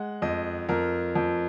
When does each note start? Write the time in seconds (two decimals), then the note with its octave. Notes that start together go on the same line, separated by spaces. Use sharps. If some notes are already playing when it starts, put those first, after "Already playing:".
Already playing: G#3 F#5
0.22 F2 D#5
0.69 F2 A#4
1.15 F2